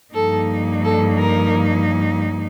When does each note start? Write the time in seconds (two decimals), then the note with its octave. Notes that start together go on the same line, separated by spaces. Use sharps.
0.14 G2 F3 A#3 D#4 A4
0.84 A4
1.18 A#4